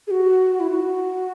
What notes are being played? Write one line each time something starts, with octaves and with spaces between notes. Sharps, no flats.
G#4
F#4
E4
F#4